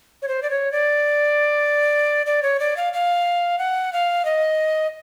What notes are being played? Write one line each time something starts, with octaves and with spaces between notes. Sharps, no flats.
C#5
C5
D5
C#5
D5
D5
C#5
D5
F5
F5
F#5
F5
D#5